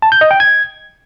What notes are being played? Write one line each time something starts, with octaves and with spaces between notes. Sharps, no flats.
A5
G6
D#5
G5
G#6